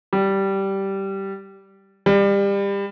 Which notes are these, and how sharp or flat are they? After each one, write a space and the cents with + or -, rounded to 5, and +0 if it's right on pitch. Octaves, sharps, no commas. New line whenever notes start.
G3 -10
G3 +25